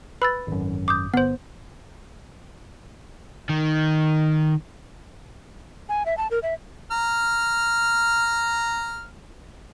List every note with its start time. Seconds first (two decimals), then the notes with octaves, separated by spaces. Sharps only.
0.22 B4 B5 E6 A6
0.47 G#1 F#2
0.88 D6 D#6 G6
1.14 G1 B3 C5
3.49 D#3
5.89 G#5
6.06 E5
6.18 A5
6.31 A#4
6.43 E5
6.91 A#5 F6